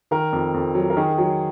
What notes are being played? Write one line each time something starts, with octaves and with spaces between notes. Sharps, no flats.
D#3 A#4
F2
F2
F#3
A#4
D#3 G#4
F#3